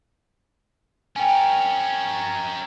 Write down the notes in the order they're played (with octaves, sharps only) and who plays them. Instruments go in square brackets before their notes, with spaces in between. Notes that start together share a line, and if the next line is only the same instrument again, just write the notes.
[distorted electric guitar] C#4 A#4 [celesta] G5 G#5